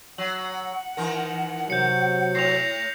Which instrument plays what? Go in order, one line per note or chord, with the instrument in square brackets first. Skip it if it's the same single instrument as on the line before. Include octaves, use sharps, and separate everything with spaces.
[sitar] F#3 [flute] F#5 [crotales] F#7
[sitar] D#3 E3 A#4
[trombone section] C3 F#3 [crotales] G6 C#7
[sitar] A2 [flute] A#6 [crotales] C7 F7